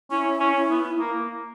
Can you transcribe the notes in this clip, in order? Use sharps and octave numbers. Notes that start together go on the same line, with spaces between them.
C#4 E4
C#4
B3
A#3